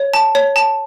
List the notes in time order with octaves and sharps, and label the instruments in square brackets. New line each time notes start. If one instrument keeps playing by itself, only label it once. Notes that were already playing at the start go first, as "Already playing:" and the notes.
Already playing: [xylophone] C#5
A5
C#5
A5